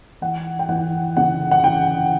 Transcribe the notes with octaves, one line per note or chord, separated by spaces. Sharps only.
E3 F#5
G5
E3 F#5
C#3 F#5
F#5
E3 G5